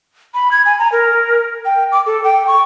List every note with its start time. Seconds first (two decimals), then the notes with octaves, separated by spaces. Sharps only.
0.34 B5
0.52 G#6
0.65 G#5
0.79 A#5
0.92 A#4
1.65 G5
1.92 D6
2.06 A4
2.24 G5
2.47 C#6